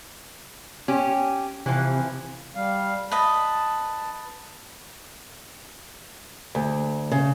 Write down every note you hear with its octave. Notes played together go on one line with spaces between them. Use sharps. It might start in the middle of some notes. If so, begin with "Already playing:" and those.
C#4 G4
C3 E3 F3
G3 F5
B4 D#5 A5
D2
C#3